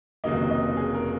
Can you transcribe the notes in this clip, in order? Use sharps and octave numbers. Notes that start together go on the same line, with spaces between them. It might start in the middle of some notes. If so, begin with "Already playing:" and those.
F1 D#2 C#3 F#3 A#3 D#5
D#5
G#4
A#4